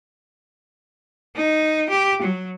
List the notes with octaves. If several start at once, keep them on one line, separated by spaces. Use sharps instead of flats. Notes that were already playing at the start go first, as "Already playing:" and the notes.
D#4
G4
F#3